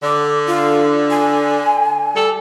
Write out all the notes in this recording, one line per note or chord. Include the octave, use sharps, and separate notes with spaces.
D3 D6
F4
G#5
G3 A4